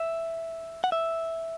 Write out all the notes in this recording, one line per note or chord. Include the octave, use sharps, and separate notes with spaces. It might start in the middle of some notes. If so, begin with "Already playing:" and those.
Already playing: E5
F#5
E5